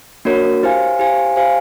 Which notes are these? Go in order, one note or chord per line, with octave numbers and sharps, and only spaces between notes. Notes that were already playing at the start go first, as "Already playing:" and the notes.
A#3 D4 F#4 A#4 C#5
E4 G4 C5 F5 G#5
E4 G4 C5 F5 G#5
G4 C5 F5 G#5